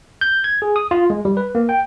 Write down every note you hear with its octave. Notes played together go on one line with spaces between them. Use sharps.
G6
G#6
G#4
D#6
F4
G#3
G3
B4
A#3
G5